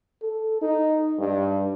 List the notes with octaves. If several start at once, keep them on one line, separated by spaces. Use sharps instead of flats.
A4
D#4
G2